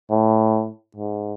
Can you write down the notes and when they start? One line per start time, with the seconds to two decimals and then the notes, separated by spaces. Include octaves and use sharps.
0.11 A2
0.96 G#2